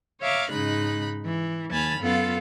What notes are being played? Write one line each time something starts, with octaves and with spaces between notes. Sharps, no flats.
C#5 E5 F5 A#5 D6
G#2 C#3 G#3 D#4 B5 F#6
E3
D#2 G#5 A5 B5 F6
F#2 B3 F4 A4 F5